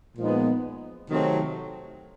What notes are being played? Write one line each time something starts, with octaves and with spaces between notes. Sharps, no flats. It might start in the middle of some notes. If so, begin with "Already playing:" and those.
A#2 F3 G#3 B3 D#4
C3 D#3 F#3 A3 C4